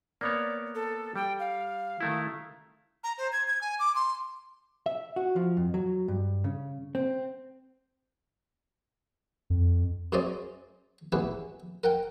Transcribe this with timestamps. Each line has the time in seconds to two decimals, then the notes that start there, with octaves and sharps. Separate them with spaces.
0.21 A#3 B3 C#5 D5
0.75 A4
1.16 G3 G5
1.39 F5
2.01 D#3 A3 E4
3.04 A#5
3.18 C5
3.32 G#6
3.48 G#6
3.61 G#5
3.79 D6
3.95 C6
4.86 E5
5.16 F#4
5.36 F3
5.57 F2
5.74 F#3
6.08 G2
6.44 C#3
6.95 C4
9.50 F2
10.12 F#2 C#4 G#4 C5 D5 D#5
11.12 A1 B3 E4 G#4 B4
11.84 A#4 F#5 G5